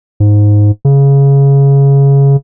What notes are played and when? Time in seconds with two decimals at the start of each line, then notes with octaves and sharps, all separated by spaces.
0.20 G#2
0.85 C#3